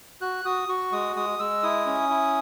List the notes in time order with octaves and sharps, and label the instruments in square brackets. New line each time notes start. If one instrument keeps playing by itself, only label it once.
[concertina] F#4 F#6
F#4 D#6
F#4 C#6
G#3 D#6
G#3 D#6
G#3 E6
E4 D#6
C#4
E4